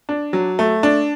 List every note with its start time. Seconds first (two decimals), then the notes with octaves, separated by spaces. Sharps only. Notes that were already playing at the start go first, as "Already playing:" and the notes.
0.09 D4
0.33 F#3
0.59 A3
0.83 D4